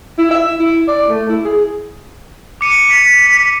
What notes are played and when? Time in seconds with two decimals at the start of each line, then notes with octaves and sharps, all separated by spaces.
0.18 E4
0.31 E5
0.59 E4
0.87 D5
1.09 A3
1.29 E4
1.45 G#4
2.61 D6 C#7 D#7
2.90 B6